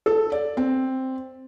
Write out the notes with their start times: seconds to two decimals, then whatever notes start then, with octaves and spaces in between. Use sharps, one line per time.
0.06 A4
0.32 D5
0.57 C4